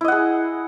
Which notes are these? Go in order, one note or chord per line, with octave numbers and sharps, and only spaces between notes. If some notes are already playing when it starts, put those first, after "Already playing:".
E4 G#4 D#5 F#5